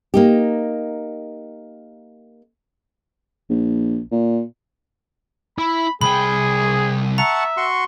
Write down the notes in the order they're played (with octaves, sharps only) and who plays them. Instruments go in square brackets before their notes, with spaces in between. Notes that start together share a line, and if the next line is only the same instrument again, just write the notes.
[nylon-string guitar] A#3 D#4 G4
[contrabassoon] A#1
A#2
[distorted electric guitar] E4 [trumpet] B5
[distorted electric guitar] C2 G5 [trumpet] G#4 [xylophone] B5
[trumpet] E5 [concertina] F#5 A5 C#6 [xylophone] A#5
[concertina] F#4 C6 C#6